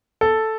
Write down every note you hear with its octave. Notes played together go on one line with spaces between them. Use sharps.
A4